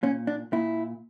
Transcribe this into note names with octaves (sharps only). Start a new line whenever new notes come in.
A#2 C#4
D4
A#2 E4